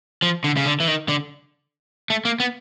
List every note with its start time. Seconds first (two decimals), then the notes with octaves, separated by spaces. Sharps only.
0.22 F3
0.44 D3
0.57 C#3
0.66 D3
0.80 E3
0.88 D#3
1.08 D3
2.10 A3
2.25 A#3
2.40 B3